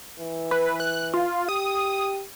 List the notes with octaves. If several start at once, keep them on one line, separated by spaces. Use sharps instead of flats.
E3
B4
F#6
F4
G4 D#6